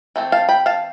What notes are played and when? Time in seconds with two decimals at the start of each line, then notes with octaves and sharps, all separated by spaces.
0.16 E3 A3 C4
0.32 F5 A5
0.49 G5 B5
0.66 F5 A5